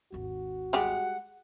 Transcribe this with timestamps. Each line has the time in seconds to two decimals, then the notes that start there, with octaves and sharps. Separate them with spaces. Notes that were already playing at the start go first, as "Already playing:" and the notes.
0.12 G#1 D#2 F#4
0.73 G3 G#3 G4 F#5